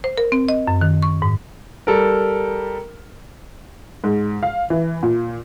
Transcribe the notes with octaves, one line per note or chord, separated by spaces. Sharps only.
C5
A#4
C4
D#5
F#2
D#3
C#6
G#2
G3 A4 A#4
G#2
F5
E3
A#2